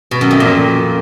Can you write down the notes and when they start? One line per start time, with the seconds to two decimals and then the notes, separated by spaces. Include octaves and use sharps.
0.11 B2
0.21 F#2
0.31 F2
0.40 A#2